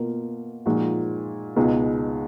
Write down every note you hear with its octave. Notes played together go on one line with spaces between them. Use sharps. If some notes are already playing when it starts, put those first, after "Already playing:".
Already playing: B2 A#3 F4 A#4
A#2 F3 G#3 D#4 F#4
C#2 B2 G#3 D#4